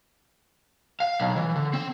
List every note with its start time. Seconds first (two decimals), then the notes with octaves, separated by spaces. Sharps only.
1.00 F5
1.20 B1
1.36 E3
1.56 D3
1.73 C4